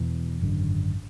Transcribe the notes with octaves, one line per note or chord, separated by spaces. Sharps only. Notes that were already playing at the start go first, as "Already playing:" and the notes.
Already playing: E1 E2 B2 E3
G#1 F#2 D3